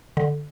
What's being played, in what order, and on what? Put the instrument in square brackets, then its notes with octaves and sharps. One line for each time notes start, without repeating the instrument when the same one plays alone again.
[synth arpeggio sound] D3